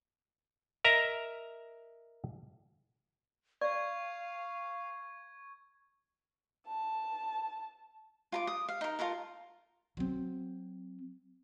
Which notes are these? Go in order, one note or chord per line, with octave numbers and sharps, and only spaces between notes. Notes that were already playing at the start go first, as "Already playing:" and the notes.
A#4 D#5 E5 A#5
D5 F5 C#6 G#6
A5
F4 A#5 D6
D#6
F5
D#4 A#4
F4 A4 A#4 A#5
F#3 C4